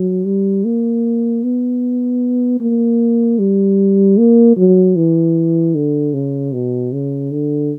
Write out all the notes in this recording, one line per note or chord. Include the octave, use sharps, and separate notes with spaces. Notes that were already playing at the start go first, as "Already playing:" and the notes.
Already playing: F#3
G3
A#3
B3
A#3
G3
A#3
F#3
E3
D3
C#3
B2
C#3
D3